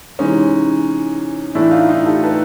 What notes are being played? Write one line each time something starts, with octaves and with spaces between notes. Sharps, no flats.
C3 E3 G#3 C#4 D#4
A2 E3 A3 D4 E4
D#4 F4
D#4 F4
G4 A4
A4 B4